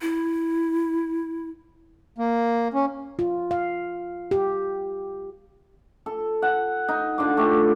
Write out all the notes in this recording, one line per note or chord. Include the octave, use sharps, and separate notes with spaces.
E4
A#3
C#4
F4
F5
G4
A4
F#5
D#4
D3 F4 D6
A3 G4